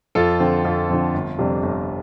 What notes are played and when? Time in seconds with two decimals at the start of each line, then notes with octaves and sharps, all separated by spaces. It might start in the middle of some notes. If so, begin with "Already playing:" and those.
0.15 F2 F4 A4
0.40 D3 F3 C4
0.65 F2 F4
0.89 D3 F3 C4
1.14 G1
1.39 F2 C3 G3 D4
1.63 G1